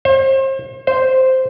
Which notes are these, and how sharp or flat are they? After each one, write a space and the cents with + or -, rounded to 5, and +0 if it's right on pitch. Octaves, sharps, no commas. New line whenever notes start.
C5 +35
C5 -5